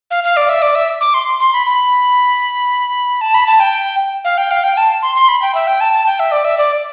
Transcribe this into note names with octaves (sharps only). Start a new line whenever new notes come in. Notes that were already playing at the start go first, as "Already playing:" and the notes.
F5
F5
D5
E5
D5
E5
D6
C6
C6
B5
B5
A5
B5
A5
G5
F5
G5
F5
G5
A5
C6
C6
B5
G5
E5
G5
A5
A5
G5
E5
D5
E5
D5